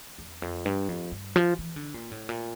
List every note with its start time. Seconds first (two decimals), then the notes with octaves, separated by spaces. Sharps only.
0.19 E2
0.42 F2
0.66 G2
0.89 F2
1.12 G2
1.36 F3
1.59 E3
1.76 D3
1.94 A#2
2.12 A2
2.29 A#2